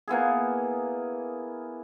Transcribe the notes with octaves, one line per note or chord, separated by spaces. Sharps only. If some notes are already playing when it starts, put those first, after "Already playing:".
A#3 B3 E4 G#4